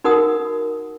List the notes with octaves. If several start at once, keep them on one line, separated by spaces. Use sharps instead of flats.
D#4 F#4 A#4 F#5 D#6